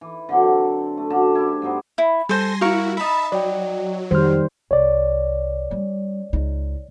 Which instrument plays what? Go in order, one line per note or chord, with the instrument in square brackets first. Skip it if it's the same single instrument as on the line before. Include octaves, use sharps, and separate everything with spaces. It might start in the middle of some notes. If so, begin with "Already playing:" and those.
[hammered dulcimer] E3
D3 F#3 C4
A3
F#2 D3 A5
E4 G4
G2 B3 D#4 C5
[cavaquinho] E4
[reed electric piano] G3 [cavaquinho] A4 C5 [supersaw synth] G#5 C6 A#6
[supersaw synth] E4 F#4 [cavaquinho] A#4 F5 C#6
[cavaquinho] D#4 B5 [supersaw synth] E5 A5
[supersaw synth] F#3 [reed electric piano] D5 G5
[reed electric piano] F2 F6 [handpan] D#3 G3 C5
[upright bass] C2 [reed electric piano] C#5 D5
[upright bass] G3 C#4
C#2 D#4